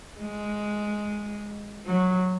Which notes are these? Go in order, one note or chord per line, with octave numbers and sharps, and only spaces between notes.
G#3
F#3